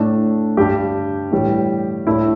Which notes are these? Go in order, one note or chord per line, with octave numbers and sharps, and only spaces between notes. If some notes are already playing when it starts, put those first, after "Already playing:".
Already playing: A2 A3 D4
G2 G3 D4 G4
A2 E3 G3
A2 A3 D4 E4